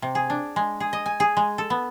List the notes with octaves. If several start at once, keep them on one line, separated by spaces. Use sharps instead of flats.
C3
G#4
D4
G#3
G#4
D#5
G#5
G#4
G#3
A4
B3